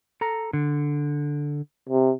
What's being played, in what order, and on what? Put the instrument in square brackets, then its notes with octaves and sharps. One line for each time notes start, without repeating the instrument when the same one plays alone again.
[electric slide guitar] A4 A#5
D3
[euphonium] C3